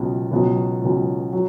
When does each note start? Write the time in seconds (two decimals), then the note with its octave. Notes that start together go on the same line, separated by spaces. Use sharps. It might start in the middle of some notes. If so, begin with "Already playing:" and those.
Already playing: C#2 B2 F#3
0.31 C#2 B2 F#3
0.82 C#2 B2 F#3
1.33 F#3